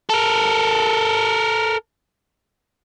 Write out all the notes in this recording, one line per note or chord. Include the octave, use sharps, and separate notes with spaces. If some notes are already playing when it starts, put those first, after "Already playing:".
A4 A#4